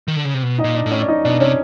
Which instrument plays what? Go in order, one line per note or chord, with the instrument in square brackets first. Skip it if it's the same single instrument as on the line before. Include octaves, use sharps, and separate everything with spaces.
[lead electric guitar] D#3
D3
C#3
C3
B2
[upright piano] D#4 D#5
[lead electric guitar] A#2
[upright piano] D4 D5
[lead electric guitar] A2
[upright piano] C#4 C#5
D5
D#4 D#5
[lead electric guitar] B2 [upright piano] D4 D5
[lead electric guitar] C3 [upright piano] C#4 C#5